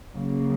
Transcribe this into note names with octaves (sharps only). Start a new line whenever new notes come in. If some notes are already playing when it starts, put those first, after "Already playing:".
C#3 F#3 A#3